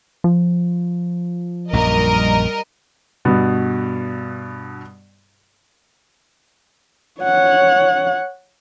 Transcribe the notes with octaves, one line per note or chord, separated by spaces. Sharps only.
F3
A#1 F#2 A#2 G3 A#4 D#5
G2 B2 B3
C#5 F#5